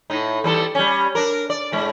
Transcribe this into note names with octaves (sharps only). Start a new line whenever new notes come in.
A2 D#4
E2 G3 A4
G3 C#4
D4 A#4
D5
A2 G#3